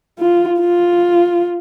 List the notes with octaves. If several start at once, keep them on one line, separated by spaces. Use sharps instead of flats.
F4
F4